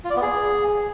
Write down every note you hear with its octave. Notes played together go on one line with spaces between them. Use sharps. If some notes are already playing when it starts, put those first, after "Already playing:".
F4
D5
B3
G#4